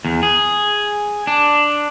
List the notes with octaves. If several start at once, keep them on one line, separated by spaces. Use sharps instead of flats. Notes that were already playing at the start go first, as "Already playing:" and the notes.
E2
G#4
D4